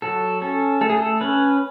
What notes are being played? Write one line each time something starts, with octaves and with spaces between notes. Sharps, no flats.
F#3 A4
C#4 A4
A3 A4
G#4
A4
C#4 B4